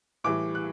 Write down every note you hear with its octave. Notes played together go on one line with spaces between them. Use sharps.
A2 E3 G3 D6
F#6